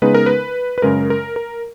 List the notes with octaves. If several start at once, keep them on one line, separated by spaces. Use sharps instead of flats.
C#3 G#3 B3 D#4 B4
A#4
B4
B4
F#2 C#3 G#3 A#4
A#4
A#4